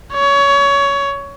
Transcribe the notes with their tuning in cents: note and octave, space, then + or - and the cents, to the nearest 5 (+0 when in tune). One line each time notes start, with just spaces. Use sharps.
C#5 +20